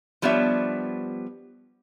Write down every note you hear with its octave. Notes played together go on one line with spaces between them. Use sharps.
F3 G3 B3 D4 C#5 E5